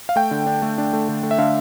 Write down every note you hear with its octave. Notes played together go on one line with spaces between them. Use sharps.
F5
A3 G5
D3
D4
A3
D4
A3
D3
A3
E5
D3 F5